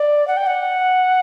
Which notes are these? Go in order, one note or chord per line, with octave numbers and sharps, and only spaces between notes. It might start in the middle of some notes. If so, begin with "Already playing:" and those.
Already playing: D5
F#5
G5
F#5